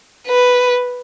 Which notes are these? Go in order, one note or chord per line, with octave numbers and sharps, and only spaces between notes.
B4